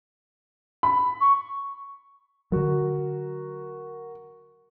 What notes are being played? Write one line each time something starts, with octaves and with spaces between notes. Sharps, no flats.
B5
C#6
D3 F#3 F#4 A#4